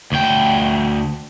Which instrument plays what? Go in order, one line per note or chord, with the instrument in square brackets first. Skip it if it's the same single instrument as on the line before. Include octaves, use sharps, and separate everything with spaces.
[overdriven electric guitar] D2 G5